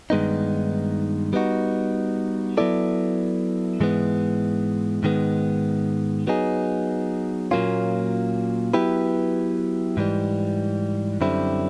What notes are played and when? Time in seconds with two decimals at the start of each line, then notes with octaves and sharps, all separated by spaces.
0.10 G2 D#3 G#3 B3 D#4
1.33 G3 B3 D#4 F#4
2.57 F#3 B3 E4 A4 D5
3.80 G#2 E3 G#3 B3
5.03 G#2 D#3 G#3 B3
6.27 F#3 B3 D#4 G#4
7.51 A#2 F#3 A#3 C#4 F4
8.74 F#3 B3 E4 G4 B4
9.97 G#2 E3 G3
11.21 F#2 D3 G3 C4 E4